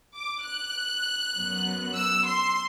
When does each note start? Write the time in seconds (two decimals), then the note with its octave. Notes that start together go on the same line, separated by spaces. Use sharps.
0.16 D6
0.45 F#6
1.37 F#2 F#3 B3
1.97 E6
2.27 C6